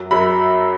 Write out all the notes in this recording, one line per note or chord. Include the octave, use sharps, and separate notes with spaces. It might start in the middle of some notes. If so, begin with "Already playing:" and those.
Already playing: F#2 F#3
F#2 F#3 B5